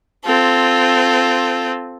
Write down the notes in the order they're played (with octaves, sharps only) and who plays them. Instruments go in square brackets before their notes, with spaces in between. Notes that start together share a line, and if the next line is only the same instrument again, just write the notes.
[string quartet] C4 F4 A4